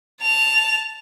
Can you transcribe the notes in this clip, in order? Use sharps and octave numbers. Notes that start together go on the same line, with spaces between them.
A5 F7